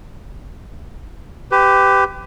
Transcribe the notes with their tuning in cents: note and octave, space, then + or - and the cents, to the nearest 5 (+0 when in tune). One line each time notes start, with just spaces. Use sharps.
G4 +0 B4 +30